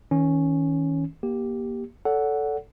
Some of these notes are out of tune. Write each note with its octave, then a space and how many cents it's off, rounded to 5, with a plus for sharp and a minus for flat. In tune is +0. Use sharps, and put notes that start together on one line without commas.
D#3 +40 C#4 +0
A#3 +25 G4 +0
A4 +0 D5 -45 F#5 +0